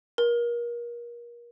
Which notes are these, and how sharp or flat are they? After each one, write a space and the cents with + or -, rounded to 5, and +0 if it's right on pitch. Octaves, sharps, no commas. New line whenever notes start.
A#4 +30